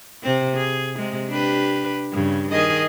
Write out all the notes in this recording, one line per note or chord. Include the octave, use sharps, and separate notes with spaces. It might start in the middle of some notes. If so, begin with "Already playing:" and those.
C3 C4
G#4
C3 G#3
D4 G4 B4
G2 C#3
D#3 G#4 D#5